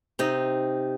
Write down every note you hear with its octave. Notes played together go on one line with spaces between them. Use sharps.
C3 D#4 D#5